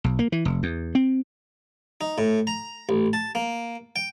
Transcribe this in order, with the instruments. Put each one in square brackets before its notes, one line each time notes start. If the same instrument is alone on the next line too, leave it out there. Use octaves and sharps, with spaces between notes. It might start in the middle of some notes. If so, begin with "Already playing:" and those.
[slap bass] B1
A#3
E3
F1
E2
C4
[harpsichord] D#4
A2
A#5
A1
A5
A#3
G5